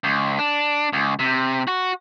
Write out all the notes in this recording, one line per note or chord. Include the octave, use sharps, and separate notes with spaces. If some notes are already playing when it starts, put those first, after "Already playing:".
C#2
D4
C#2
C3
F#4